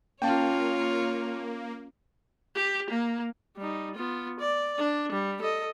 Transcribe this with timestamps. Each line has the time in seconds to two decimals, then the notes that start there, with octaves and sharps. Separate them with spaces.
0.22 A#3 C#4 F4 C#5 F5 G5 A5
2.55 G4
2.90 A#3
3.57 G3 D#4
3.95 B3 F4
4.40 D5
4.78 D4
5.12 G3
5.41 A4 D#5